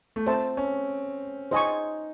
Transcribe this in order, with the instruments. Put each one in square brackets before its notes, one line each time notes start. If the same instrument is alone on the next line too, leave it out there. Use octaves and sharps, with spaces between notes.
[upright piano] A3
[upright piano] C4 [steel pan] C5 E5 A5
[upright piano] C#4
[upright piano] D#4 [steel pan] C5 D#5 G#5 C#6